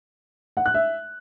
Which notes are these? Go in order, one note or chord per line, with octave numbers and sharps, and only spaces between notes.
F#5
F#6
E5